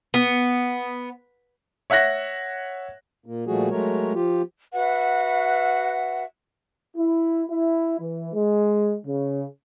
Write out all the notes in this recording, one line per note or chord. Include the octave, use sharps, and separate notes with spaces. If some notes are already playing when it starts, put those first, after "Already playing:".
B3
C#5 E5 F#5 F#6 A#6
A#2 A#3
A#2 F3 G3 A3 F#4 G#4
F#3 G#3 A3 A#4 C#5
F3 F4 G4
F#4 B4 E5 F#5
E4
E4
E3
G#3
C#3